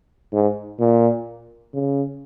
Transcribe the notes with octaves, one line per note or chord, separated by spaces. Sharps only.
G#2
A#2
C#3